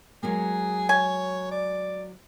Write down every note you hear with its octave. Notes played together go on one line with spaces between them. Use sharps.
F#3 G#3 A#3 G#4
C#5 G#5
D5